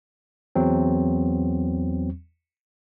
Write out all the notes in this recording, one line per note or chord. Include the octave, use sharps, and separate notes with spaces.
E2 F#3 C4